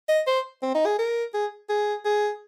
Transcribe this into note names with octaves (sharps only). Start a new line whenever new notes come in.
D#5
C5
C4
D#4
G#4
A#4
G#4
G#4
G#4